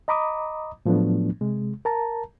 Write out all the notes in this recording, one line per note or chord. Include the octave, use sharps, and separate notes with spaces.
D#5 A#5 B5 D6 D#6
A2 F3 F#3 A3 B3 D4
C3 G#3
A#4 A5 A#5